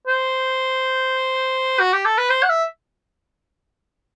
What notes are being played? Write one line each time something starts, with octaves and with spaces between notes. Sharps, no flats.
C5
F#4
G4
A4
B4
C5
F#5
E5